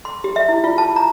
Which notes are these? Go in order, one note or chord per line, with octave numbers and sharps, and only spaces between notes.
C6
G4
E5
E4
F4
A5
A#5